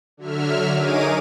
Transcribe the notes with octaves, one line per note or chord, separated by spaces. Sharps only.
D3 F#3 E5 F6
D#4 G#4 A#4 C#5 D6 D#7